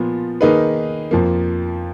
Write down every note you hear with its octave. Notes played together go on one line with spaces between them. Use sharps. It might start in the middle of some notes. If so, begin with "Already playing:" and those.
Already playing: A#2 F3 B3
D#3 A#3 D#4 G#4 B4
F2 F3 A#3